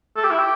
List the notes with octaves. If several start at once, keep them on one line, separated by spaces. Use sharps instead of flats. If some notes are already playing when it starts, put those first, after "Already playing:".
A4
G4
E4
G4